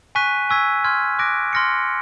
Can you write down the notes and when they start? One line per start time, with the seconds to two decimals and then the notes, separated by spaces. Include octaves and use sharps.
0.15 G#5 C#6 F#6 B6 D#7
0.49 G#5 C#6 E6 G#6 B6
0.84 C6 F6 G#6
1.19 D6 F#6 A#6 D7
1.53 C6 F6 A#6 C#7